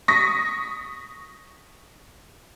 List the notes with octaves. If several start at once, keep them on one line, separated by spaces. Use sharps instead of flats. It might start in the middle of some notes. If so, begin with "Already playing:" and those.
C#6 D#6 A#6 B6